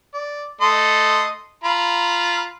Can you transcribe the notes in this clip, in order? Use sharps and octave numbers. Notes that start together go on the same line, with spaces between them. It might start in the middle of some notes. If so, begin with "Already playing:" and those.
D5
A3 D#5 C6
F4 A#5 B5